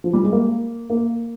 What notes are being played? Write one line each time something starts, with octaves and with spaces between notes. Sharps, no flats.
F3
G3
G#3
A#3
A#3